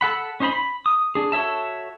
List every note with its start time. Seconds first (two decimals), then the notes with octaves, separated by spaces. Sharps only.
0.01 A4 F#5 B5
0.40 C#4 D#4 C5 A#5 B5
0.52 B5
0.86 D#6
1.15 D4 G#4
1.32 F#4 A4 C#5 E5 A5